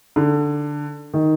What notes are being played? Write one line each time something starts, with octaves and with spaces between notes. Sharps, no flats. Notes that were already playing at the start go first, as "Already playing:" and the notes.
D3
D#3